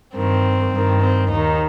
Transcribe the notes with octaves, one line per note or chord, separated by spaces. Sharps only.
G2 D#3 C4
G2 D#3
C4
D#2 D#3 D#4